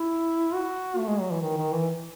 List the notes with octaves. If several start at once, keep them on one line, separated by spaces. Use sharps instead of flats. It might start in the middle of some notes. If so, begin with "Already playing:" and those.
Already playing: E4
F#4
A3
G#3
F#3
E3
D#3
D#3
E3